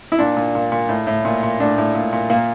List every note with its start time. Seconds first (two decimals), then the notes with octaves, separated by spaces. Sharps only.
0.12 E4
0.19 A#2 D4
0.37 A#2
0.55 A#2
0.72 A#2
0.89 A2
1.07 A2
1.25 A#2
1.43 A#2
1.60 A2 D4
1.78 A2
1.95 A#2
2.13 A#2
2.30 A#2 A#3